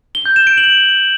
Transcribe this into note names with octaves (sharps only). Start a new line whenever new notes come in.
G7
G6
E7
D7
F#7